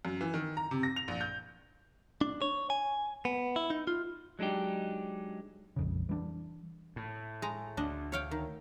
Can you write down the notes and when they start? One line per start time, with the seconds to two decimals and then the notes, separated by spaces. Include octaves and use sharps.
0.05 F#2
0.21 E3
0.34 D#3
0.57 A#5
0.71 C3
0.83 A#6
0.96 F7
1.08 A#1
1.21 G6
2.21 D4
2.42 C#5
2.70 G#5
3.25 B3
3.56 E4
3.70 D#4
3.87 F4
4.39 F#3 G#3 D4 D#4 G4
5.76 A#1 F2 C#3
6.09 E3 G3 C4 D4
6.96 A2
7.42 G#3 A#5
7.77 D2 D4 D#5
8.12 C#5 F5 G5
8.31 D#3